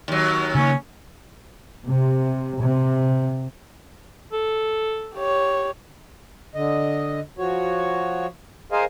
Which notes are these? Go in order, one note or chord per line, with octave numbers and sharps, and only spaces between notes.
D#2 F#3
C#3 A#3 C#4
C3
C3
A4
G4 C#5
D3 D#5
F3 F#4 C#5
G#4 A#4 C5 D#5 F5 G#5